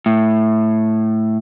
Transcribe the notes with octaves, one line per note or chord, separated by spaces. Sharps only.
A2